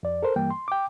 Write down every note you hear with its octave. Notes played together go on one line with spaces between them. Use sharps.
F2 D5
A4 A#4 C5
G2 E3 G3 A#3 G5
C6
G5 D6